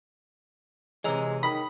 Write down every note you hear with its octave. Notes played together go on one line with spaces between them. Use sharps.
C3 E3 G#3 C#5 A#5 E6
D#3 B5 D#6